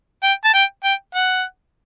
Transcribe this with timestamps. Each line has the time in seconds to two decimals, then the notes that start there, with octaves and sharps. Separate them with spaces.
0.23 G5
0.44 A5
0.54 G5
0.84 G5
1.15 F#5